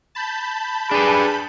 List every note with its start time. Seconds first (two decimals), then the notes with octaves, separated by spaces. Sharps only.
0.15 A5 B5 G6
0.91 D4 G#4 B4